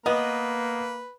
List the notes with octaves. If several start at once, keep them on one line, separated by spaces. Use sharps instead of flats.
A#3 B3 B4 D#5